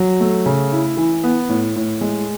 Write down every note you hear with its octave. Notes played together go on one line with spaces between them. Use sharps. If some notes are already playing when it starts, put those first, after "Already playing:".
Already playing: F#3
A3
C#3
E4
E3
B3
A2
A2
G#3